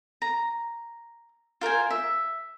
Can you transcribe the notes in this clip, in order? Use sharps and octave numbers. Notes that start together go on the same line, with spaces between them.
A#5
F4 A#4 C5 G#5
E5